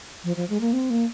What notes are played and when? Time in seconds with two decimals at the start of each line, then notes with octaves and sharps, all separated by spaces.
0.24 F3
0.37 F3
0.49 G#3
0.61 A#3
0.73 C4
0.90 A#3